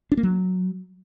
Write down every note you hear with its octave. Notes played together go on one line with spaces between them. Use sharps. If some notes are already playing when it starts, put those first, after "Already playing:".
D4
A#3
F#3